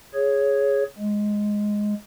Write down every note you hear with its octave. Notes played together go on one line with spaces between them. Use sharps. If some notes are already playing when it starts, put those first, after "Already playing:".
G#4 C#5
G#3